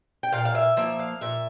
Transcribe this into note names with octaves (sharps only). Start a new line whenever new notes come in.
G5
A#2 F5
F5
E5
F3 A#3 E5
F5
A#2 E5